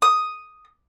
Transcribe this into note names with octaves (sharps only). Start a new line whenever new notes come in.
D#6